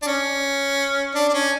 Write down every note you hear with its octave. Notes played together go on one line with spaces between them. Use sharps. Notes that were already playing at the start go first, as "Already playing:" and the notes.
D4
C#4
D4
D4
C#4